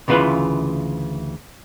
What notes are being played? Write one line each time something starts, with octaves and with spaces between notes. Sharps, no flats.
D2 C#3 E3 F4 B4